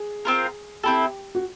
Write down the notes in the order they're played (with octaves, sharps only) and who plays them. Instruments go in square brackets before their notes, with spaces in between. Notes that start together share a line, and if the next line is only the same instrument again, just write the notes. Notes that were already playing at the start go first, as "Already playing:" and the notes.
Already playing: [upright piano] G#4
[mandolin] C4 F4 A#4
[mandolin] C4 E4 A4 [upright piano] G4
[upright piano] F#4